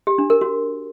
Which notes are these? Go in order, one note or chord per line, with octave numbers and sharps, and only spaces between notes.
G4
D4
A#4
F#4